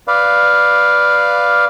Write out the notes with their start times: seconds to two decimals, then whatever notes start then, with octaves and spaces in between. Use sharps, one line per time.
0.08 B4 D5 F5